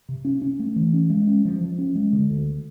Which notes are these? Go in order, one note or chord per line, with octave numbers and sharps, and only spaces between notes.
C3
C#4
C#4
A3
E3
C#4
G#3
C#4
F3
F3
C#4
G#3
D3
D2